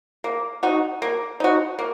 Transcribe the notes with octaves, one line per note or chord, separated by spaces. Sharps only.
A#3
D#4 F#4
A#3
D#4 F#4
A#3